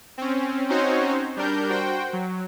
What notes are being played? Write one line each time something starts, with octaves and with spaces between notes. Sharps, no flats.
C4 C#4
C4 C#4 D#4 F#4 C5 C#5
G3 D4 A#4 G6
F#4 C5 G5
F#3